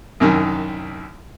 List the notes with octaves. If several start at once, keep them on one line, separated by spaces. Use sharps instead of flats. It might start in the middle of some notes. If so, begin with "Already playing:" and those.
C2 F#2 D#3